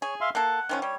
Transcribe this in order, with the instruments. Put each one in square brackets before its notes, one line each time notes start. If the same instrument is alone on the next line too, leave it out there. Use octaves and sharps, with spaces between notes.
[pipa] G#4 [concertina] C#5
[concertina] E5 F5 C6
[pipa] A#3 A4 [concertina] F#5
[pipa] D#3 F3 C#4
[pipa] G3 [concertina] C#5